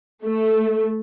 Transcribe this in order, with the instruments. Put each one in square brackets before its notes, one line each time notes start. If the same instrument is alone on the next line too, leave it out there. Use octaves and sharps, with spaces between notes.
[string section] A3